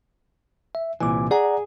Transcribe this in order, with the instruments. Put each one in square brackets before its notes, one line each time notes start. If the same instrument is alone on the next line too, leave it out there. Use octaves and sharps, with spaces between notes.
[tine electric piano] E5
[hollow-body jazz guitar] C2 A#2 E3 [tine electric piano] G#5 D6
[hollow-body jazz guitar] G#4 [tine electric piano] D5 F#5 A#5